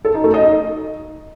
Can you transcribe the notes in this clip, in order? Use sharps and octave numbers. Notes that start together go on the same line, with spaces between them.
A4
D#4
A3
D#5
D#4